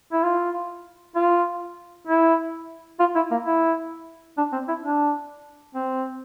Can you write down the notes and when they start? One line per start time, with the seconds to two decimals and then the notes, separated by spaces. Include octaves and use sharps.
0.12 E4
0.23 F4
1.15 F4
2.07 E4
3.00 F4
3.15 E4
3.31 A#3
3.45 E4
4.38 D4
4.53 C4
4.68 E4
4.83 D4
5.75 C4